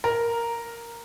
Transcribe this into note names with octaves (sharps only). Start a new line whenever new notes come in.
A#4